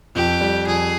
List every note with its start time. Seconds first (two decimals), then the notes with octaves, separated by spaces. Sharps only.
0.15 F2 G4
0.41 G3
0.67 F2 G#4